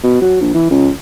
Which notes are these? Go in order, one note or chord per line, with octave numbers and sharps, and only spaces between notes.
B2
F#3
A#1
E3
C#2